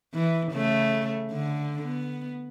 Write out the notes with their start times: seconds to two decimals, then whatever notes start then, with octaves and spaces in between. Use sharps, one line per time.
0.13 E3
0.52 C#3 A3
1.31 D3
1.82 B3